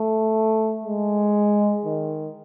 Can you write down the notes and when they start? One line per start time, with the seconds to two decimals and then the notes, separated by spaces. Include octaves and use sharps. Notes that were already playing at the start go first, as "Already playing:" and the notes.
Already playing: A3
0.84 G#3
1.85 D#3